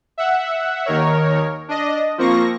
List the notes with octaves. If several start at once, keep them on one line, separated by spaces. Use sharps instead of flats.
E5 F#5
D#2 D#3 A#4 C#5
D4 D#5
F3 A#3 C4 C#6 A#6